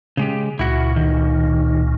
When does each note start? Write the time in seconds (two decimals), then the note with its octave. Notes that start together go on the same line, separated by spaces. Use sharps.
0.17 C#3 G#3 G4
0.59 C#2 A#2 E4 F#4
0.96 D#3